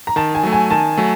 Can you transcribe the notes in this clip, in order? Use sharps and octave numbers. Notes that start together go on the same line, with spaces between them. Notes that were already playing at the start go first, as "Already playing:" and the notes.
A#5
D#3 A5
G#5
F#3 A3
G#5
D#3 A5
F#3 A3